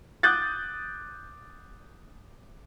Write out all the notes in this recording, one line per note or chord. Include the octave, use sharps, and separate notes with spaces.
D6 D#6 F#6 G6 A6